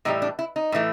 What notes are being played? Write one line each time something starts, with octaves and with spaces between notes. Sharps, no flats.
A2 E3 G3 D#4
D4
E4
D#4
A2 E3 A3